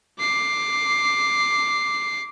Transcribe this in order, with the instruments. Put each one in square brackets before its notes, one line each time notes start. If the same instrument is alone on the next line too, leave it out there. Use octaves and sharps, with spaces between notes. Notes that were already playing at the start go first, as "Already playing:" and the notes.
[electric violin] D6 C7